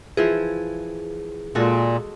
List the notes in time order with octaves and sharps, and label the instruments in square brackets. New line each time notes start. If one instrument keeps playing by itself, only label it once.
[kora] E3 F3 E5 [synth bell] G#4
[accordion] A#2 [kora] G#3 F#4 A4